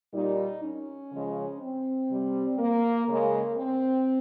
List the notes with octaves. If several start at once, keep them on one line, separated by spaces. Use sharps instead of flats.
A#2 G3 D#4
C#4
C#3 F3 G#3
C4
C3 G3
A#3
C#3 G#3 A#3
C4